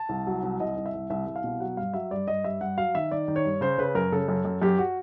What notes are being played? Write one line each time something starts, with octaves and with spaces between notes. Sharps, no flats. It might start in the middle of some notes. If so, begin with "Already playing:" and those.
Already playing: A5
C2
F#3
C2
C2 D#5
C2
E5
C2
C2 E5
C2
F5
B2
F#3 F#5
G2 F5
F#3 E5
G2 D5
G2 D#5
G2 E5
G2 F#5
F#3 F5
D#3 E5
D#3 D5
D#3
C#5
G2
C#3 C5
C#3 B4
F#2 A#4
C#3 A4
F#2
F#2
F#2 G4
F#4